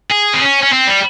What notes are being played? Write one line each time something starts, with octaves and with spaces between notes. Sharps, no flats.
G#4
C4
C#4
C#4
C4
G3